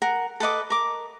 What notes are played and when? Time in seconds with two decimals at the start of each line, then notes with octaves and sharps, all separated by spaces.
0.02 A#4 F#5
0.40 A4 B4 D#5 D6
0.70 A#4 D6